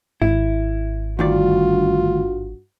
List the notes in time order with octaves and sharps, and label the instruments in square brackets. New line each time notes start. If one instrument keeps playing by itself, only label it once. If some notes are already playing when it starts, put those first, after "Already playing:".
[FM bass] G#1 [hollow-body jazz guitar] E4
[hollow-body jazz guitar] D2 D#3 D5 [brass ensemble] G2 F#4 [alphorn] F4